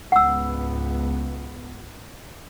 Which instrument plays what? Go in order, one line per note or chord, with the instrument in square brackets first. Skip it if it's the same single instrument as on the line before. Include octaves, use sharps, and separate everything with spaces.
[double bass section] C#2 G#2 B3 [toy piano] F#5 E6